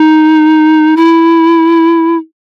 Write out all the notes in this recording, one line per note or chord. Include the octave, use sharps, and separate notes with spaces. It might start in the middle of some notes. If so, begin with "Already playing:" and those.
Already playing: D#4
E4